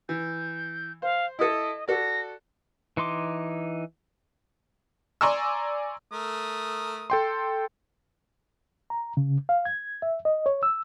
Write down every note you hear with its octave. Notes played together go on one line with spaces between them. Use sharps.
E3 G6
C5 F5
E4 A4 D#5
F#4 A4 D5 A#6
E3 D#4 C6 D6
D5 G#5 A#5 C6 C#6 E6
A3 A#4 D#6
A4 G5 C6
A#5
C#3
F5
G#6
E5
D#5
C#5
E6